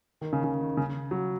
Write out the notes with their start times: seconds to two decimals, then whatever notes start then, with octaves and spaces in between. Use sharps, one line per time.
0.21 D#3
0.33 C#3
0.44 C#3
0.61 D#3
0.77 C#3
1.11 F#3